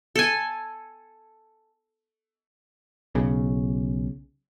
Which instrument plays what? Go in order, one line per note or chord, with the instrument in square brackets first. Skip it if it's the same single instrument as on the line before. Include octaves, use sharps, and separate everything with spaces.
[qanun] A4 G#5
[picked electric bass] B1 C#3